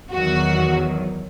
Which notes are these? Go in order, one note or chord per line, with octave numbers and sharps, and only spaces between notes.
E2 D#3 F#3 F#4